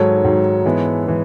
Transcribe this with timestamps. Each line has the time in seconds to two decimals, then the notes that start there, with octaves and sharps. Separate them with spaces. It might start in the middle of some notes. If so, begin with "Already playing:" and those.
Already playing: G#2 D#3 F#3 A4 C#5
0.24 G#2 D#3 F#3
0.65 G#2 E3 G#3 B3
1.06 E3 G#3 B3